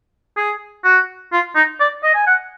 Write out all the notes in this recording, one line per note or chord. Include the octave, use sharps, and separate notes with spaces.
G#4
F#4
F4
D#4
D5
D#5
G#5
F#5